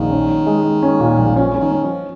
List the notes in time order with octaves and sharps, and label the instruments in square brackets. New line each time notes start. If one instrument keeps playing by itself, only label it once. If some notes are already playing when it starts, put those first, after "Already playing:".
Already playing: [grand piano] A#1 [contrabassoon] D#3
[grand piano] C#4
C#4
G#3
G#3
C#4
A#2
A#1
[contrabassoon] F3 [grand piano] C#4
[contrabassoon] C#3 [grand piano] C#4
[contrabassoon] D#3
[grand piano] C#4
[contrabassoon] F3